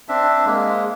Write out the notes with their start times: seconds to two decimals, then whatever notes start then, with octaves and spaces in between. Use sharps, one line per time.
0.09 C4 D4 E5
0.46 G#3 A#3